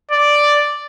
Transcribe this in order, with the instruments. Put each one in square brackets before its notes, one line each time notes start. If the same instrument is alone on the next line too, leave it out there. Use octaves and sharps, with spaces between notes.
[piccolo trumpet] D5